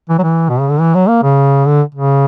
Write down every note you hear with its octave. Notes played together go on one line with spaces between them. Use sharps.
E3
F#3
E3
B2
C#3
D3
E3
F#3
A#3
C#3
D3
C#3